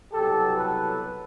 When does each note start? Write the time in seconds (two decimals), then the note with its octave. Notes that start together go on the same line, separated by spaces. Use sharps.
0.13 C2 B2 F#3 G4 A4
0.56 A4 B4